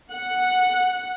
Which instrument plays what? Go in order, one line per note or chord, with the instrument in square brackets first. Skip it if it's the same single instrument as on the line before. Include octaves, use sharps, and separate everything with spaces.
[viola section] F#5